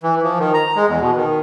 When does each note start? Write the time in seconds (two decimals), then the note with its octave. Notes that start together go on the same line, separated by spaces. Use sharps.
0.03 E3
0.22 F3
0.39 D#3
0.54 A#5
0.76 G#3
0.88 E2
1.01 B2
1.17 D#3